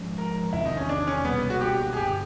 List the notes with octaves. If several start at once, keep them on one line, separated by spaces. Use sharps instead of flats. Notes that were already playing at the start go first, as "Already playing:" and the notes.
Already playing: G#2 F3 G#3 C#4
A#4
E2 C3 D#3 E4
D#4
C#4
D4
C#4
C#2 B2 G3 A#3 B3
F#4
G4
G#4
G2 D3 G3 G4